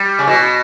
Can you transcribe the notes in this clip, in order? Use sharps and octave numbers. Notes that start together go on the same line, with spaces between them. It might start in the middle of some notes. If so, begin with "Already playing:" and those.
Already playing: G3
C#3
B2